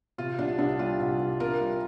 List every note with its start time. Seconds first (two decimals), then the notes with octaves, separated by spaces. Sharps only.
0.18 C3 F4
0.39 C2 D4
0.59 C2 D4
0.79 G3 F4
1.00 C2
1.20 C2
1.40 C3 F4 A#4
1.61 G3